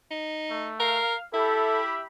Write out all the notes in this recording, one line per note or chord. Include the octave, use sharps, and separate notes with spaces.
D#4
A3
A#4 F5
E4 G4 A4 E5 B5